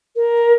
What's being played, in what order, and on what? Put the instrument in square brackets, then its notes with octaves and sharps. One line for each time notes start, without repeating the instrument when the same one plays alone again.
[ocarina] A#4